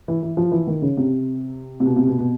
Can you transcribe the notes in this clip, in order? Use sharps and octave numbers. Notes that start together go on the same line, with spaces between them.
E3
E3
F3
E3
D#3
C#3
C3
C3
B2
C3
B2
B2